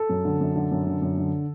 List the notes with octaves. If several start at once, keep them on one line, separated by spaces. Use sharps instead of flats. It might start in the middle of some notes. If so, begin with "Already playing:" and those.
Already playing: A4
F#2
D3
F#2
D3
F#2
D3
F#2
D3